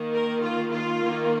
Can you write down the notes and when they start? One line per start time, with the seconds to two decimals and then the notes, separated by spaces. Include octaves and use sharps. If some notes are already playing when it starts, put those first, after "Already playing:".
Already playing: D#3 A#3
0.13 A#4
0.43 F4
0.72 F4
1.01 D#3 A#3